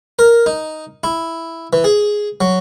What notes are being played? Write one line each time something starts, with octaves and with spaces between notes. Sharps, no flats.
A#4
D#4
E4
E3
G#4
F#3